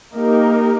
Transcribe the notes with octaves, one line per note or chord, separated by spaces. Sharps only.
A#3 D#4 G4 A#4